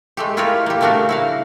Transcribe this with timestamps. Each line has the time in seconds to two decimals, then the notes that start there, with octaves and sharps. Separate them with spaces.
0.17 G#3 A3 G4
0.37 E4 F4 G4 A#4 B4 C#5
0.66 A#3 G4
0.81 C#3 G3 A3 D4 F#4 A#4
1.09 E4 F#4 F5